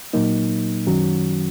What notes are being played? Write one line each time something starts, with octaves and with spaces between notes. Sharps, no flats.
A#2 F#3 A#3 D#4
F#2 D#3 F#3 C#4 F#4